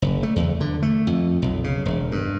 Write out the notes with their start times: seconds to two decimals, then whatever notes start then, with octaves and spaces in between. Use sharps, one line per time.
0.02 F#1
0.23 A3
0.36 E2
0.61 D3
0.83 A3
1.07 F2
1.42 B1
1.64 C#3
1.85 E1
2.12 G2